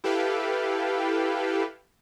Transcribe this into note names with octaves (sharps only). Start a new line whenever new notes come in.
E4 G4 A4 B4 F5 G5